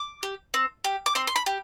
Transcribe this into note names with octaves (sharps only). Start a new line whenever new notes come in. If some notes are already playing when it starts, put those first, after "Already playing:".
Already playing: D6
G4
C4
G4
D6
C4 C6
C6
B5
G4